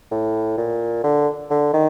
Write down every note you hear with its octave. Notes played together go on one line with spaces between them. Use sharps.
A2
A#2
D3
D3
D#3